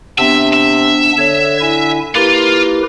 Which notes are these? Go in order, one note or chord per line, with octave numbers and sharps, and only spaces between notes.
C3 B3 D4 E5
E5
D3 C#5
E4 G#5
A#3 E4 F4 G4 B4